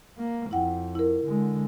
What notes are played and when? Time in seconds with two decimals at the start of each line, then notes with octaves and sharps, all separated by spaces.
0.18 A#3
0.51 F2 E4 F#5 G5
0.95 E4 A#4
1.26 D3 G#3